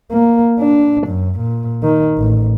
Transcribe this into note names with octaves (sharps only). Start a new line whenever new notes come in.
A#3
D4
F#2
A#2
D#3
A1